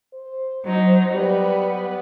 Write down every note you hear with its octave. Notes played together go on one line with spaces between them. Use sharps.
C5
F#3 D#4
G3 B3